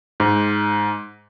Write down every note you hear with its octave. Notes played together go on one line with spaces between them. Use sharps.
G#2